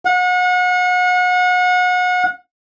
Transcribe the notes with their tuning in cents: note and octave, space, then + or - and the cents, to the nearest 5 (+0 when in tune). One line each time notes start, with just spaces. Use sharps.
F#5 -35